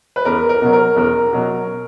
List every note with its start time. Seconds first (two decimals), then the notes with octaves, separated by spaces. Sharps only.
0.16 B4
0.25 E2 A#4
0.49 A#4
0.62 B2 F#3
0.73 A#4
0.97 E2 A#4
1.33 B2 F#3